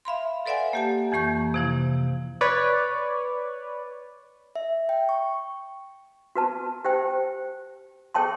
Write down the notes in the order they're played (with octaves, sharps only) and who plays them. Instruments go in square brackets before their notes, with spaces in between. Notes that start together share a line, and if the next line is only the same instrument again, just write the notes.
[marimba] E5 F5 B5 C6
A4 B4 D5 E5 F#5 G#5
A#3 G4 A5
F2 E3 A#3 C#6 G6
C3 F3 E4
[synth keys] B4 C#5 D5
[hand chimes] E5
G5
C#6
[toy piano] F#4 B4 A5
G4 C5 G5
G#4 A4 C#5 G5 A5 C6